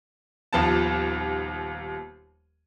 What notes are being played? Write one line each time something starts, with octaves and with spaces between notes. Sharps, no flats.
D#1 D#2 F3 B3 A5